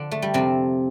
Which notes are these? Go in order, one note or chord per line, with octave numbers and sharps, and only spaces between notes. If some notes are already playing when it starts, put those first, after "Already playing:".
Already playing: D3 F3 D4
A3
G3
F2 C3 F3 C4